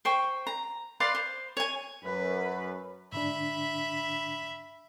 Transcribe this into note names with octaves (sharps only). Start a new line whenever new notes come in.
C5 G5 C#6
A#5
B4 D5 F5 C6
C5
C#5 G#5
F#2 B4
G#2 D3 D4 E5 B5